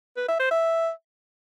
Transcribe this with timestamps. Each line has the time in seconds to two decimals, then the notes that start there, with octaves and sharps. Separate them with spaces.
0.17 B4
0.28 E5
0.40 C5
0.51 E5